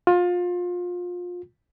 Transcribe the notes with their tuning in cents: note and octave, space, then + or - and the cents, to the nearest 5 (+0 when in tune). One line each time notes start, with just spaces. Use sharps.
F4 +25